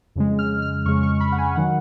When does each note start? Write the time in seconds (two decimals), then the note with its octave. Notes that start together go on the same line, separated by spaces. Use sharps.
0.16 F2 C#3 G#3
0.39 F6
0.62 F6
0.85 F2 C#3 G#3 C#6
1.03 C#6
1.20 B5
1.32 F#5
1.38 G#5
1.56 D#3 F#3 F#5